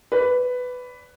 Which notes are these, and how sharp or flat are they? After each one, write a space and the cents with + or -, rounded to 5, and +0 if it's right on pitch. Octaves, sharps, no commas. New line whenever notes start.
B4 +10 D5 -30